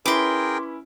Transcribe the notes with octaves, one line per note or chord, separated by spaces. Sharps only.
C#4 E4 G#4 A#4 B4 G5 C6 D6